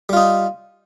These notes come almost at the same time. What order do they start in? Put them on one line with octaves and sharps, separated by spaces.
G3 F4 D#4